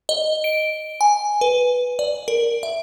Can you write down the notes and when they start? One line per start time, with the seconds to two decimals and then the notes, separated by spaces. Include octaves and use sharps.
0.09 D#5
0.44 D7
1.01 G#5
1.41 B4
1.99 D5
2.28 A#4
2.63 E5